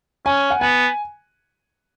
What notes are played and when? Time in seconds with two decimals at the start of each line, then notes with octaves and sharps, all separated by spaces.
0.26 C#4 G#5
0.50 F#5
0.61 B3 G#5